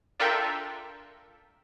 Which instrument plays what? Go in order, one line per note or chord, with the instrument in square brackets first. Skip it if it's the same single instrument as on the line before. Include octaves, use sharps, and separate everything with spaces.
[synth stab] D4 F4 A4 A#4 E5 G5